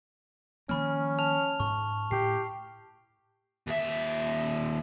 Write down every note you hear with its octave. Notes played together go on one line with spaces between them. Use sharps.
D#3 F3 A#3 C#4 B5 F6
A5 F6 F7
G#2 C#6
A2 G4 C7
D#2 E5